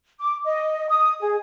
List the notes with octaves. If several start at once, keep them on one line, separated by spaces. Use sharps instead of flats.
D6
D#5
D#6
G#4